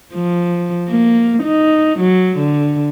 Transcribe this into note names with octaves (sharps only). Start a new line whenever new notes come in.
F3
A#3
D#4
F#3
D3